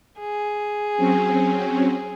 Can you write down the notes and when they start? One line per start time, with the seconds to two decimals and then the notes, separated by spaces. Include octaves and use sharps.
0.20 G#4
0.97 F#3 C4 C#4